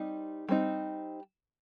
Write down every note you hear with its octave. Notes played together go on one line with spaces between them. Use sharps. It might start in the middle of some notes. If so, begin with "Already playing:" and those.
Already playing: G3 C4 D#4
G3 C4 D#4